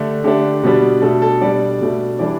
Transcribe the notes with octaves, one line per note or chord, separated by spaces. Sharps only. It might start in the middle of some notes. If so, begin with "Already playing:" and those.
Already playing: D3 A3 D4 G4
D3 A3 D4 G4
B2 G3 B3 D4
B2 A3 D4 A4
A4
B2 G3 D4 D5
B2 A3 D4
E3 G3 D4 D5